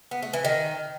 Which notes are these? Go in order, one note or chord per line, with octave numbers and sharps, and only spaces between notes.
B3
A3
E3
D#3